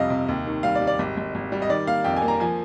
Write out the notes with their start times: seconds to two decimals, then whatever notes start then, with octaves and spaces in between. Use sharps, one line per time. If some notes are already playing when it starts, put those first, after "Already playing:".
Already playing: A#1 F2 C3 G3 D#5 F5
0.10 C3
0.29 D#2
0.47 D#3
0.63 G3 F5
0.75 D5
0.81 G3
0.87 D5
0.99 G#1
1.17 G#1
1.35 G#1
1.52 G3
1.62 D#5
1.69 D#3 D5
1.87 A#3 F5
2.04 F2 G5
2.16 G#5
2.22 A#3
2.28 A#5
2.40 F3 G#5